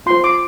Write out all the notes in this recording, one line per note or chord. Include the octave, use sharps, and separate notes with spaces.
F4 C5 C6
D6